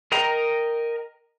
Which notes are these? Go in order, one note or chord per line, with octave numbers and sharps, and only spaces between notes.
A#4 D#5 G5 A#5